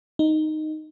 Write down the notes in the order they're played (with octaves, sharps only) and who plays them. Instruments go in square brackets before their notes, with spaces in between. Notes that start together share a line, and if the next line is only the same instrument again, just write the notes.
[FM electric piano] D#4